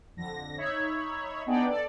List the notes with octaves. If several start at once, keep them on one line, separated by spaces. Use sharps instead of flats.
F2 D3 A#6
D#4 C#5 E5 B5
B3 D4 D#4 G#4 D5 G5
A4 D5